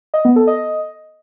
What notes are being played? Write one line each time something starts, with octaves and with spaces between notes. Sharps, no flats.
D#5
B3
A4
D#5